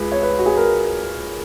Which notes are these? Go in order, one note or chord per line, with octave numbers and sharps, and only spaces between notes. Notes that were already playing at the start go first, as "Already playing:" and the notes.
Already playing: C#2 G#4 B4
C#5
B4
F#4
G#4
A#4